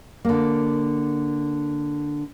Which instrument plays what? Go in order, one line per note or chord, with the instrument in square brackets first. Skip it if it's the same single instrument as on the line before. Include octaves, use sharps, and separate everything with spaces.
[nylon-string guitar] D3 A#3